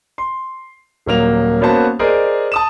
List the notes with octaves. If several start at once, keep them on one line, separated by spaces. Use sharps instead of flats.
C6
D#1 F#3 A#3 F7
A#3 B3 C#4 F#4 C5 A5
G#4 A#4 C5 D5 D#5
A5 D#6 E7